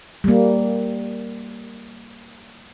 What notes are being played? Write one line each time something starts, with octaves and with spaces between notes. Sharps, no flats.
G3 A#3